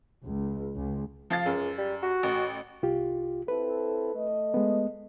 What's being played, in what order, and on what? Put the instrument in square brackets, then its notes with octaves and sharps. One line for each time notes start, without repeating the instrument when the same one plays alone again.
[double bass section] C#2
C#2
[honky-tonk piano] F3 F5 A6
[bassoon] C#2 [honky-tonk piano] F#2
[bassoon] G3
F#4
[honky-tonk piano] A1
[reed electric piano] C2 F4 G4
[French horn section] C4 E4 A4 [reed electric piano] B4
[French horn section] A3 D#5
[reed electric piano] G#3 B3